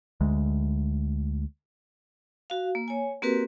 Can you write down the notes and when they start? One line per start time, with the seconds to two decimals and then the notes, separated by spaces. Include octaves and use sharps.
0.21 D2 G#3
2.50 F#4 F5
2.75 A#3
2.88 C#5 G#5
3.22 A#3 C4 F#4 G4 A#4 B4